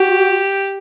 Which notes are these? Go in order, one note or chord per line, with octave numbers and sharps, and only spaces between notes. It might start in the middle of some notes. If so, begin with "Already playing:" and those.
Already playing: F#4 G4